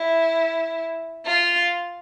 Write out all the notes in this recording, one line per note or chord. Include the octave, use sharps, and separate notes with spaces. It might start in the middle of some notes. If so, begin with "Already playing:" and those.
Already playing: E4
F4